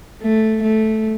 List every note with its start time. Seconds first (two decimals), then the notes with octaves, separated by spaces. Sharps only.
0.22 A3
0.63 A3